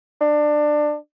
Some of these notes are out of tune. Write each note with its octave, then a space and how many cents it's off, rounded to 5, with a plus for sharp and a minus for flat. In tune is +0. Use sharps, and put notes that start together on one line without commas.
D4 +20